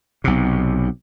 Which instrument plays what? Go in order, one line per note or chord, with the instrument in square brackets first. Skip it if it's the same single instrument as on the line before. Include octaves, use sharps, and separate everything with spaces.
[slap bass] B1 C3